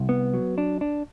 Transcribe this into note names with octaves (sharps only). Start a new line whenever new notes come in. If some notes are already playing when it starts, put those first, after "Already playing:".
Already playing: C2
B3
F#3
D4
D4